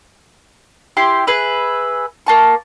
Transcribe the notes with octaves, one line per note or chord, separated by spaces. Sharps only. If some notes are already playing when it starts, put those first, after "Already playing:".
E4 G4 C6
G#4 B4 E5
A#3 A5 C#6